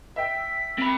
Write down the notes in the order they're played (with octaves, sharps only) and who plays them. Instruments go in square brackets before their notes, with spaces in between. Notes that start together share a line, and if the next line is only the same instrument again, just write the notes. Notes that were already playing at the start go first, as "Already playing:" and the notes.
[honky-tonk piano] E5 G5 [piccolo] B6
[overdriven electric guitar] C4 B5